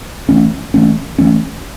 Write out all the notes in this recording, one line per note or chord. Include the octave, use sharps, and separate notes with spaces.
E3 A3 C#4
E3 A3 C#4
E3 A3 C#4